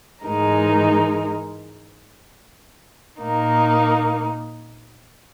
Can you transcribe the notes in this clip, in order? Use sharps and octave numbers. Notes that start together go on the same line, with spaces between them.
G#2 E3 G#3 D#4 A#4
A#2 A#3 D#4